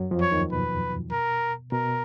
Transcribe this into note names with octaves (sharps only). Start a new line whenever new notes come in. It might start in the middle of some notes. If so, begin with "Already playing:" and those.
Already playing: F#2 F#3
F2 F3
C#5
D#2 D#3
B2 B4
A#4
B2 A#4